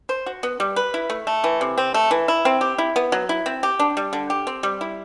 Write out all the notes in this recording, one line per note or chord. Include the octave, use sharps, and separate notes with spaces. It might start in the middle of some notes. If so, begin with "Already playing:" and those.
C5
F#4
B3
G3
B4
E4
A3
A3
E3
C3
C4
A3
E3
E4
C4
G4
E4
B3
F#3
E4
C4
G4
D4
G3
D3
G4
C4
G3
E4